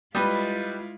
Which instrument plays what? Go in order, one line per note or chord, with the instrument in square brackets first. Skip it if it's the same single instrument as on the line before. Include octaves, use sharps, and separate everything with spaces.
[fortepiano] G3 B4 [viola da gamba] G#3 E4 F4 [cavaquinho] D#5 B5